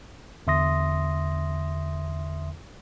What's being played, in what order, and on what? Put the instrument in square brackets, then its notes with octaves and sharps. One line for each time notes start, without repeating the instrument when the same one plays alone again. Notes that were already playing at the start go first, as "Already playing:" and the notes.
[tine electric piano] E2 D3 E5 C6 D#6 A#6